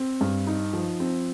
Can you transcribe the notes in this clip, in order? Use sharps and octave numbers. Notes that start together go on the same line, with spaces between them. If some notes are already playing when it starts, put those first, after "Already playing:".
Already playing: C4
G2
D#4
F3
C4